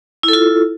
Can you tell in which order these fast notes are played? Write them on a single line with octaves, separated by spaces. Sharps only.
E4 A4 F4